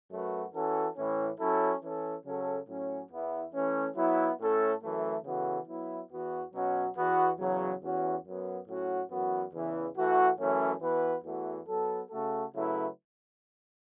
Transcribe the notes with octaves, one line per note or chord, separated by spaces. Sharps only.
F#2 F#3 A3 F#4 B4
E3 C#4 F#4 A4
A2 E3 C#4
F#3 C#4 E4 A4
E3 C#4 A4
C#3 F#3 C#4 A4
A2 F#3 C#4
E2 E3 B3 E4
E3 A3 C#4
F#3 B3 E4
A2 A3 C#4 A4
F#2 E3 A3
C#3 E3 B3 F#4 A4
F#3 B3 E4
E2 E3 B3 F#4
B2 F#3 C#4 F#4
E2 E3 B3 F#4
E2 C#3 F#3
E2 E3 C#4 F#4
F#2 F#3 B3
A2 F#3 C#4 F#4
F#2 E3 B3 F#4
E2 C#3 E3
E3 A3 F#4
F#2 E3 A3 C#4
E3 B3 F#4 B4
E2 E3 A3 F#4
F#3 B3 A4
C#3 A3 F#4 A4
C#3 F#3 A3 E4 B4